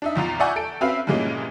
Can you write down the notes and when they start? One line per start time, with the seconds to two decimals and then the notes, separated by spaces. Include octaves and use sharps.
0.02 D4 D#4 E5
0.15 A#1 E2 F4 A#5
0.40 D5 E5 F#5 G#5 C#6 G6
0.56 A4 D7
0.81 C4 C#4 F#4 B4 E5 F5
1.07 G2 A#2 E3 G#3 A#3 C#4